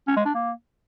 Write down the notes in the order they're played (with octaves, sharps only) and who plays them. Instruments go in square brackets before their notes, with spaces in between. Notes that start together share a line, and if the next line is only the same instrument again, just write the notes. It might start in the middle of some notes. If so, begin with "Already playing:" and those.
[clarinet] C#4
G#3
D4
A#3